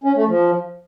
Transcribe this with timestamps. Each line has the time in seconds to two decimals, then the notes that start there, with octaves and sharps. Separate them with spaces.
0.04 C#4
0.16 A3
0.28 F3